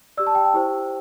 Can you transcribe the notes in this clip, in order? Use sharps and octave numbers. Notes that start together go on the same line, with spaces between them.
G4 D5 E6
A5
G5
G5
E4 G4 C5